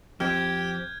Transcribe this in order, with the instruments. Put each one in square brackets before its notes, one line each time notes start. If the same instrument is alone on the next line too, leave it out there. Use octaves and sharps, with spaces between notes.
[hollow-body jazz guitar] F2 C4 [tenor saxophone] G4 [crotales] F6 G6 G#6